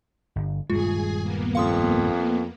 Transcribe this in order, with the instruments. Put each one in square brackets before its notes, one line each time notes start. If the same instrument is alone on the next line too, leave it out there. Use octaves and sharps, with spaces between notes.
[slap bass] G1
[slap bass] D#1 G2 G#3 [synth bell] F4 [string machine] G#4 G#5
[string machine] A#3 B3
[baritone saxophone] F2 [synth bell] F5 C6 D#6